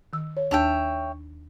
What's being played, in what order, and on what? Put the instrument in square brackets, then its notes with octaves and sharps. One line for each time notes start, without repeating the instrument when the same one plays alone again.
[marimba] D#3 E6
C#5
[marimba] D#2 D4 A5 [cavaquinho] C#5 E5 G5